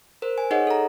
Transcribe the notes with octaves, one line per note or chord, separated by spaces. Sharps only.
A#4 C5
G#5
D#4 G#4 C#5 D#5 F#5
A4 A#5